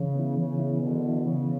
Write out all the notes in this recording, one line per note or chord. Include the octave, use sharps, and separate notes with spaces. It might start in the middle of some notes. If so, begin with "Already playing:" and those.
Already playing: C#3 E3
B3 E4
C#3 E3
B3 E4
B2 D3 E3
B3 E4
C#3 E3